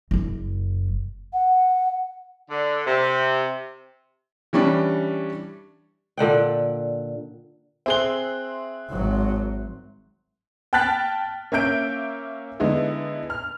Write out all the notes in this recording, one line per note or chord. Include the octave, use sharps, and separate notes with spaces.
F#1 F#2
F#5
D3
C3
E3 G3 C#4 D4
A#2 D3 F#5 G5
C4 G#4 E5 C6 F#6 G7
G#1 F#3
G5 A5 F6 F#6 A6 B6
A#3 C#4 E5 G6 D7
D3 G#3 B3 D#4 E4
F6